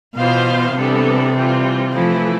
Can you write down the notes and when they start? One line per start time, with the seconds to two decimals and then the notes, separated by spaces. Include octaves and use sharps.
0.16 B2 E3 B3 F4 C5 F5
0.75 C3 E3 G3 B3 D4 A4
1.34 E3 G3 C4 F4
1.93 E3 F3 A3 E4